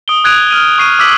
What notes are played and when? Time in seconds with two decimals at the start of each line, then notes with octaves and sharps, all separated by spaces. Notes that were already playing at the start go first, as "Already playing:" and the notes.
0.08 D#6 D7 G7
0.24 D#6 F#6 G#6 D7 D#7 F7
0.51 F6 D#7
0.78 C#6 C7 D#7
0.99 D6 E6 B6 F#7